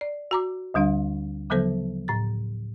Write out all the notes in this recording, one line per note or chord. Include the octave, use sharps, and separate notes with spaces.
D5
F#4 A#5 D6
D2 D3 G3 D4 F5
C#3 F3 F#3 B3 A4 C5
A2 A6